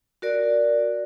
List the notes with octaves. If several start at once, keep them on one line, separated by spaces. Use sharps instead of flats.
F#4 A#4 D5